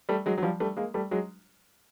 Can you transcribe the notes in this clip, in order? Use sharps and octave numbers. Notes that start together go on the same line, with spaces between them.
G3 A3
F#3 G#3
F#3
F3 G3
G3 A3
G#3 A#3
G3 A3
F#3 G#3